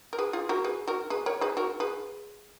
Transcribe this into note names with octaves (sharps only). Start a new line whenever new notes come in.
A#4
G#4 B4
F4 G#4
F#4 A#4
G#4 B4
F#4 A#4
G#4 B4
A#4 C#5
G#4 B4
F#4 A#4
G#4 B4